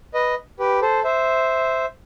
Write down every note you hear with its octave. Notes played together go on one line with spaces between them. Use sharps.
B4 D#5
G4 B4
A4 C5
C5 E5